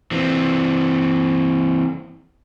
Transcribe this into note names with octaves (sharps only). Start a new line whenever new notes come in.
E3 C4